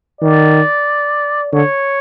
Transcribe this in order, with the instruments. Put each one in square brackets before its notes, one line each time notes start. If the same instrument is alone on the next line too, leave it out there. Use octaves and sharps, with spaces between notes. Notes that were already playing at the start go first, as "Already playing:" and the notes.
[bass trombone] D#3 [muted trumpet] D5
[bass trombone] D3 [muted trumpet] C#5